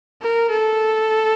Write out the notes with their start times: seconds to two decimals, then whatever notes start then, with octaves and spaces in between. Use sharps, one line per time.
0.22 A#4
0.50 A4